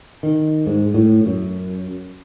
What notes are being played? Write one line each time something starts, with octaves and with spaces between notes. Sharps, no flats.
D#3
G#2
A2
F#2